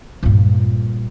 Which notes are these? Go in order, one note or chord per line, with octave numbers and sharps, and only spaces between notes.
G2 A#2